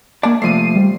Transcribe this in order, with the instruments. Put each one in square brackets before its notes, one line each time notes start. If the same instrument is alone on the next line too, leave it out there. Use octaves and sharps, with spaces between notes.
[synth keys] A#3 G#5 [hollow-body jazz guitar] D5 A5
[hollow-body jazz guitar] C3 F3 A3 [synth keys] C7 D#7
[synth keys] G3